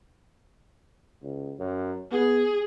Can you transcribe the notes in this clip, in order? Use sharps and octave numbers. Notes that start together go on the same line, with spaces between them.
C#2
F#2
B3 G#4